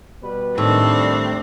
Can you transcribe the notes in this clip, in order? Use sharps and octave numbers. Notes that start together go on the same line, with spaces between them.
B2 G3 B4
A2 D#3 G3 C4 D4 A4